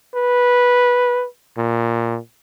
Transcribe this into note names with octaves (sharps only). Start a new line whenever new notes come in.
B4
A#2